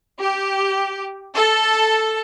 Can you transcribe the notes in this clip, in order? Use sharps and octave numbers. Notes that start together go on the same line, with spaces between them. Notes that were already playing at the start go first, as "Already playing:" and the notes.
G4
A4